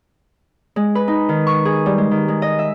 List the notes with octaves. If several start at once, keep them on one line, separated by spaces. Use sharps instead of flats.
G#3
B4
D#4
D#3
C#6
G#4
G3
G#3
D#3
G#3
D#5
E5